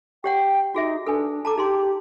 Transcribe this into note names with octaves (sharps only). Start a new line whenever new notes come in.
G4 C#5 F#5 G5
D#4 F#4 G#4 E5
D4 A4 B4 G#5
A4 A5 A#5 D6
D#4 G4 G#4 C6